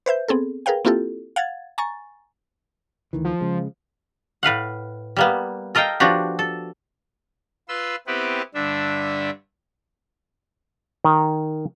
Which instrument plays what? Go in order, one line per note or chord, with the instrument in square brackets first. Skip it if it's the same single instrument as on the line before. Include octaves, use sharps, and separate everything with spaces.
[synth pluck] B4 C5 E5 G6
B3 C4 G#4 A4
G#4 A#4 B4 F5 G5
A#3 C4 E4 F4 G4 A4
F5 F#5 G#6 A6
G#5 A#5 C#6 A6
[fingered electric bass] D2 D#3 E3
[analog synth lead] F3
[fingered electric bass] C#3 G#3
[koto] A2 B4 F5 F#5
G3 A#3 B3
A4 A#4 D#5 F5 G5
F3 B3 D4 F#4 G4
A4
[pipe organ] F4 B4 C6 E6
B3 C4 E4 G4 B4
G2 D3 D4 E5
[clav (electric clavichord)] D#3